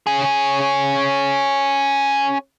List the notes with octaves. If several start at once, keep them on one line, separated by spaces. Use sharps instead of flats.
C#4 G#4